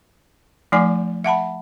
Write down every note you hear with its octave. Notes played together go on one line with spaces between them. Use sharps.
F3 A3 D#4 D5 G#5 D6
E5 F#5 A5 B5